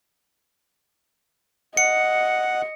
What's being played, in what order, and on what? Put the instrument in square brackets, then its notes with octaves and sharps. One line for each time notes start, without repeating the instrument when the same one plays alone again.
[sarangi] D#5 [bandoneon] F#5 [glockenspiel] C#7